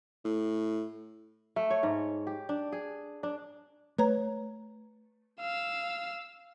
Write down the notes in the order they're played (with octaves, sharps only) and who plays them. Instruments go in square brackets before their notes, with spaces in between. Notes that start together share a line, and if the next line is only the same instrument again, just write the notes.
[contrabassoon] A2
[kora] A3
C#5
G#2
G4
D4
G#4
D4
[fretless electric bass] A3 [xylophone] B4 C#5 A#5
[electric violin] F5 E6